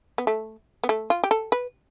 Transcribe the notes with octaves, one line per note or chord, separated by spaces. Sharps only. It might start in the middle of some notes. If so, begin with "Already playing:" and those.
B3
A3
B3
A3
F4
G4
A4
B4